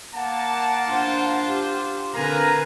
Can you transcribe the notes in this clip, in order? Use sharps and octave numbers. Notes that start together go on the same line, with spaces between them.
A#3 F#5 A5
D4 F4 C5
G4
D3 C4 A#4 B4 F5 G#5 A#5